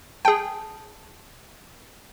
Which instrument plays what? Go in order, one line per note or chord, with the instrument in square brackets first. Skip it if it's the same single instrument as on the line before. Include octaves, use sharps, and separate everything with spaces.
[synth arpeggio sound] G#4 G5 [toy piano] A5